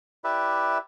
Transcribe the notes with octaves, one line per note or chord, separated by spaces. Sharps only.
E4 G4 B4 D5 E5